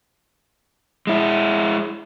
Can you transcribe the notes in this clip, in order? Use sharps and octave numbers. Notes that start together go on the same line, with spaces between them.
G#3 E4